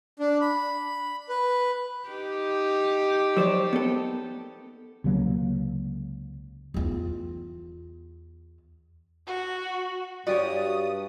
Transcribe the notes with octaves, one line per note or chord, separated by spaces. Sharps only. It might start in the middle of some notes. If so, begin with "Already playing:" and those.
D4
B5
B4
D#4 G4
F#3 C5 D5
B3 A4
C#2 C3 F#3 A#3
E2 F4
F#4
G2 F#4 G4 C#5 D5 D#6